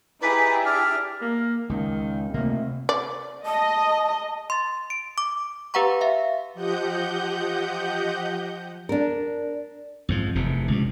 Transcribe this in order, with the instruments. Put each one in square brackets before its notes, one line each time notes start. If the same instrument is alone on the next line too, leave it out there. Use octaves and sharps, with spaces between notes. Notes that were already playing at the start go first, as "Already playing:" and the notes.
[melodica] D#4 D5 [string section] E4 G4 G#4 [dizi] B4
[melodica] D4 D5 E5 [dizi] F6
[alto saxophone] A#3
[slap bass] C#2 [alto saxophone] D#3
[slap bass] C3 A3 [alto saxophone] A#3
[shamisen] D5
[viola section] D#5 [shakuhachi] A5
[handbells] C6 A6
D7
D6
G4 B4 F5 F#5 A#5 C#6
E5 F5
[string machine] F3 G4 D#5 F#5 G6
[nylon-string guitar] D4 A#4
[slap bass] F2 G#2 F3
F1 E2 C3
C#2 G2